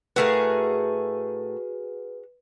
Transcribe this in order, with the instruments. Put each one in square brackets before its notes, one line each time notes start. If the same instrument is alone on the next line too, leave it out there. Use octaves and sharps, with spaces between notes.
[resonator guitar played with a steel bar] A2 A3 A#4 [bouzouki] F#4 G#4 F5 [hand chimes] B4